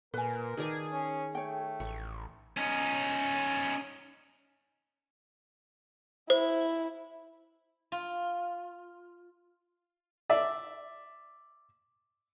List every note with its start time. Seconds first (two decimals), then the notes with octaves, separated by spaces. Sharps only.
0.14 A#2 A#4 B4 G#5
0.57 D#3 G#4 D5 A5
0.92 C#4
1.35 A3 C#5 G5
1.80 A1 C#6
2.57 C#4 D#4
6.30 E4 C5
7.92 F4
10.30 D5 E5